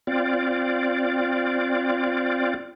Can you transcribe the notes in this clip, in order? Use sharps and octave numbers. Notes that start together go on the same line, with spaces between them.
C4 F4 D5